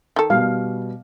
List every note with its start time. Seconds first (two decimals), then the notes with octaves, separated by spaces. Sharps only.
0.16 D#3 A4
0.30 B2 G3 F5